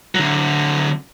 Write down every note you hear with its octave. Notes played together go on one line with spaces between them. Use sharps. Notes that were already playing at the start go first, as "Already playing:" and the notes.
D3 F#3